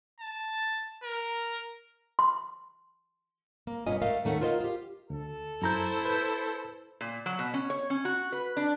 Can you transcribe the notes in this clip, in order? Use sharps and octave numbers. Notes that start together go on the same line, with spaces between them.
A5
A#4
C6
A#3
G2 B2 C#4 F4 D#5 G#5
A3 A#4 D#5 F5
D#2 D#3 A3 C#4 F#5
F4 A#4 C5 C#5 D#5 F5
F4 G4
D2 A4
F#2 E4 C5 A#5 G6
B4 G6
A#2
F#3
B2
C#4
C#5
C#4
F#4
B4
D4